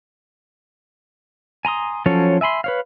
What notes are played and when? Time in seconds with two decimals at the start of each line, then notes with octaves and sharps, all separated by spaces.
1.65 G#5 A#5 C6 D#6
2.06 F3 F#3 C#4 A4 C#5
2.41 E5 G#5 B5 C6
2.64 B4 C#5 F5